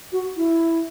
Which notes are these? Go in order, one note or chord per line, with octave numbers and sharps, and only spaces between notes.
F#4
E4